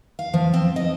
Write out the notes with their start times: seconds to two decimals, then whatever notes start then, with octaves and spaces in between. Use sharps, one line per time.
0.19 F5
0.34 F3
0.54 C4
0.76 D#5